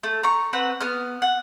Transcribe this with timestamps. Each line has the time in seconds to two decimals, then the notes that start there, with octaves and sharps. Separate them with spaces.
0.03 A3
0.23 A#5 C#6
0.53 C4 B4 F#5
0.81 B3 F6
1.22 F#5